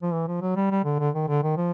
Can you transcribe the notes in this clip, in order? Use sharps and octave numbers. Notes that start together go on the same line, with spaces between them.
F3
E3
F3
F#3
G3
G3
D3
D3
D#3
D3
D#3
F3